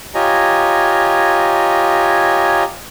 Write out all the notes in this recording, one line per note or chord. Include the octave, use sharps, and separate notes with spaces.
F4 G4 C#5 D#5 G#5 A#5